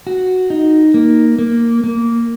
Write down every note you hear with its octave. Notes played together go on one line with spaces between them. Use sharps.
F#4
D#4
A#3
A#3
A#3